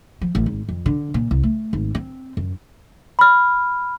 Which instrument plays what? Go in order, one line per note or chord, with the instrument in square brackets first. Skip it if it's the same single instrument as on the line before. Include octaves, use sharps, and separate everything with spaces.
[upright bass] F3
A1
G#1
F2
D3
A#2
C2
A3
G#1
C4
F#2
[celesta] B5 F6